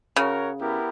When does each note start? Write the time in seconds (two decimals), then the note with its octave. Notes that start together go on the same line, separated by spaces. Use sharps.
0.16 C#3 F#4 A#4 C#5 F#5
0.60 B3 E4 G4 A#4